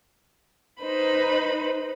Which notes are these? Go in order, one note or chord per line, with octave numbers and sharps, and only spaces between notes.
D#4 B4 C5 B5